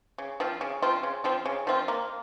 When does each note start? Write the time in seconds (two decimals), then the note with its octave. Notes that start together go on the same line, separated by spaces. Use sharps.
0.18 C#3
0.40 F3 C4 F4
0.61 C#3
0.82 F3 C4 F4
1.03 C#3
1.24 F3 C4 F4
1.46 C#3
1.67 F3 C4 F4
1.88 A#3